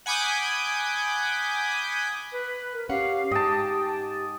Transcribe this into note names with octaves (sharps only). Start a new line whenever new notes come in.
F#5 G#5 B5 D6 D#6 G6
B4
A#4
C#4 G4 F5 F#5
G#2 D#5 G5 A5